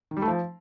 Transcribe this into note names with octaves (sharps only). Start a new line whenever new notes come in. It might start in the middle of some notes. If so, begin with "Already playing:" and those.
D#3
G3
A3
F3